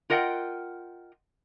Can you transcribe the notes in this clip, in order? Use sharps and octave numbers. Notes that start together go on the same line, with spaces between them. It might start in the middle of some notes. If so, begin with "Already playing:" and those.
F4 A#4 D#5 F#5 G5